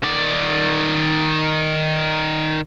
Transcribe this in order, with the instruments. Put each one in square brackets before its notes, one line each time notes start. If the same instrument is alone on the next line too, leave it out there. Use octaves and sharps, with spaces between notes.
[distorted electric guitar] D#3 D5